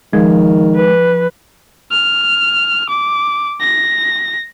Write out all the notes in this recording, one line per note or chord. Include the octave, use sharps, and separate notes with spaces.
D#3 F3 G#3
B4
F6
D6
A#6